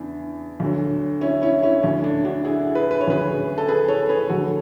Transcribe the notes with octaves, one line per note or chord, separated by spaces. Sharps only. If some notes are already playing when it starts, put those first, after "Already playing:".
Already playing: E2 C#3 E3 D4
D2 D3 F#3
C#4 E4
C#4 E4
C#4 E4
D2 D3 F#3 C#4
D4
D4 F#4
E4 G#4
G#4 B4
B4
C#5
D2 C#3 F#3 G#4 B4
A4
G#4 B4
A4 C#5
G#4 B4
D2 D3 F#3 F#4 A4